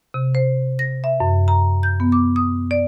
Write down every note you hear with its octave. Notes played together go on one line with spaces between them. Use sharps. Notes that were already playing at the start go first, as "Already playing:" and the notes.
C3
C5
A#6
E5
F#2
A#5
G6
B3
D6
D#6
D5